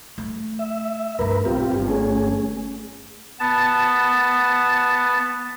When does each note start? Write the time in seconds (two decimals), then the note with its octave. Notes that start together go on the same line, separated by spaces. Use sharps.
0.18 A3
0.59 E5
1.19 G2 A3 A#4 B4
1.45 B1 C4 F4 G4
1.71 G1
1.88 A3 C#4 G#4
3.40 B3 A5